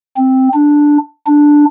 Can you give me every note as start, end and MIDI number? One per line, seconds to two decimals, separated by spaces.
0.16 0.48 60
0.54 0.98 62
1.27 1.65 62